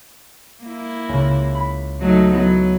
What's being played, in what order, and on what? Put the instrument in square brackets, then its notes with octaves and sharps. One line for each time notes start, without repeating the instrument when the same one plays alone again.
[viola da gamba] A#3 E4
[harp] C#2 C#3
B5
[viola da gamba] F#3 A3 D#4
[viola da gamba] F#3 B3 [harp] E4 A4 C#5